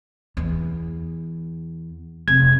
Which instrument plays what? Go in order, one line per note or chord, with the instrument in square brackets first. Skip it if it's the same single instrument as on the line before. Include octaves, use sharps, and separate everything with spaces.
[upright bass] E2
[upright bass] F1 [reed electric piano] G#6